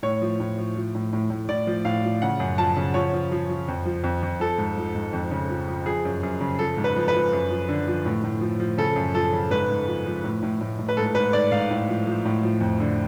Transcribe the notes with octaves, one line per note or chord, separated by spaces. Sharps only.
A2 C#5
F3
A2
F3
F3
A2
A2
A2
A2 D5
F3
A2 F5
F3
C#3 F#5
F#2
F3 A5
C#3
F3 C#5
F3
F3
F3
F2
F3
F2
F2
F3 A4
G#2
F3
G#2
F2
C#3
F3
F3
F3 G#4
F#2
F#2
C#3
F3 A4
G#2
B4
F3
B4
F3
F#2
F3
D3
F3
A2
A2
F3
F3
C#3 A4
F#2
F3 A4
C#3
G#2 B4
G#2
F3
F3
A2
A2
A2
A2
B4
G#2 A4
G#2 B4
G#2 D5
G#2 F5
A2
F3
F3
A2
F3
F2
D3